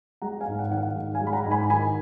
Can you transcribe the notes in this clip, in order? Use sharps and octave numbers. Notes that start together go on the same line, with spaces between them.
G#3 F#5 A#5
F5 G#5
G#2
F#5
D#3 F#5
F5
G#2 F#5
F5 G#5
G#3
B5
F#5 A#5
G#2
G#5 B5
D#3 G#5 B5